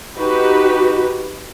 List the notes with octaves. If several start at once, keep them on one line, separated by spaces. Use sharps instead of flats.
D#4 F#4 G4 B4